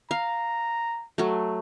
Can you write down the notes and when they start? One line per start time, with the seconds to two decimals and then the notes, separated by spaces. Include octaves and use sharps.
0.11 F5 A#5
1.18 F#3 A3